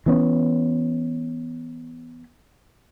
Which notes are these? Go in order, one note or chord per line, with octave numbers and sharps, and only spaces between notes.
E3 B3 C#4